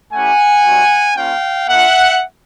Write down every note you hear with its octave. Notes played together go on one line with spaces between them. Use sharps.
A3 C#4 E4 G4 F#5 G#5
G3 C4 D#4 F#4
A#3 C#4 F4 F5 G5
A#3 D4 F4 E5 F#5